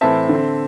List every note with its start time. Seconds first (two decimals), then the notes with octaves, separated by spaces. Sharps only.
0.01 A2 E3 C4 E5 A5
0.29 D3
0.35 C4